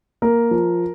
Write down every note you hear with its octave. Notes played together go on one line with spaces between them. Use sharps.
A#3 A#4
F3